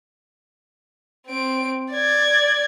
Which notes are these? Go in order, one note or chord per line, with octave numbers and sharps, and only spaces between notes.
C4 D7
D5 G#6